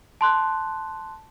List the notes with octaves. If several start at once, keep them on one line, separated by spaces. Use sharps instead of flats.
A5 C6 F#6